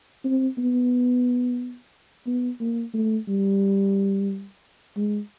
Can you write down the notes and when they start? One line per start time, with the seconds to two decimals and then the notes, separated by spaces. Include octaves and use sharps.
0.25 C4
0.58 B3
2.27 B3
2.60 A#3
2.94 A3
3.28 G3
4.96 G#3